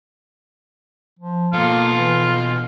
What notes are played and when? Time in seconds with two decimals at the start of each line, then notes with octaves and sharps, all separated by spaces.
1.19 F3
1.53 B2 A#3 F4 A4
1.95 E3